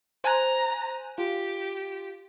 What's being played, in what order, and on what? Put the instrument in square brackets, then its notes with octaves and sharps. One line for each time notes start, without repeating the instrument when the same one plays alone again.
[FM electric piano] C5 G#5 F#6 [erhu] A#5
[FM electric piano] F4 [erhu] G4